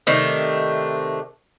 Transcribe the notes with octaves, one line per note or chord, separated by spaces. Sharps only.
C3 D#3 A3 D4